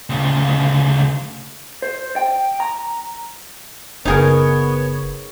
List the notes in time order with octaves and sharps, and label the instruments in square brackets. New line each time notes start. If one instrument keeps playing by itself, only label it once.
[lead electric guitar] D2 C#3
[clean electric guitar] C5
G5
A#5
[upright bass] F#1 [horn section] B3 C#5 [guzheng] D#4 G#4 A#4